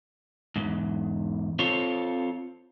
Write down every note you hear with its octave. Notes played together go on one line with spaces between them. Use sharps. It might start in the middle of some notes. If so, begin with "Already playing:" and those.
E2 G#2
C4 F4 A4 C#5